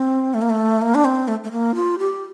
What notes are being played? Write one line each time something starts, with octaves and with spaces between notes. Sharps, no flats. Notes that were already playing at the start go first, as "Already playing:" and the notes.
Already playing: C4
A3
A#3
A3
A#3
D4
C4
A3
A3
A#3
F4
G4